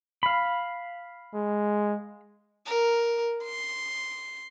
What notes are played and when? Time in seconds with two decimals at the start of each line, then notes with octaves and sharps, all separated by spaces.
0.23 F5 B5
1.34 G#3
2.66 A#4
3.43 C6